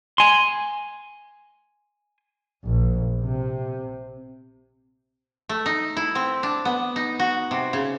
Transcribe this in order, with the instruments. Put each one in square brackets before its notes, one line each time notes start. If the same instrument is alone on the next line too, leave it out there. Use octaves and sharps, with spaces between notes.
[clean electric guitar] G#5 C6
[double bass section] A#1
C3
[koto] A3
D#4
E4
C4
D4
B3
D#4
F#4
C3
C#3